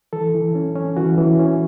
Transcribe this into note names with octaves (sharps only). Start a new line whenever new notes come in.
E3 A4
E3
C#4
C#4
E3 F#4
E3
C#4